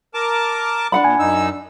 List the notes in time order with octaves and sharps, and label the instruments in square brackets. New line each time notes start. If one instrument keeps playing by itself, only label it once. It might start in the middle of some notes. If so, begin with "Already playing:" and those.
[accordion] A#4 A5 D6
[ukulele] D4 F#5 B5
[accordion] A#2 [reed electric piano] G#5
[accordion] F#2 D#4 E6